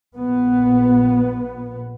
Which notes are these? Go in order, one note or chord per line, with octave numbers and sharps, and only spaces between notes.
A#1 A#2 B3